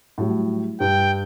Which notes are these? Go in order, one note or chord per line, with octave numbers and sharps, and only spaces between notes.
A2 F#3 G3
G2 G5